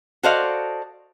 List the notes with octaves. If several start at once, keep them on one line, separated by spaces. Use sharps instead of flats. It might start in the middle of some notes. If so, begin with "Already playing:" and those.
F#4 A4 C5 D5 D#5 F5